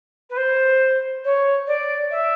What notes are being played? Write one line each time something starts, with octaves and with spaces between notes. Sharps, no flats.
B4
C5
C#5
D5
E5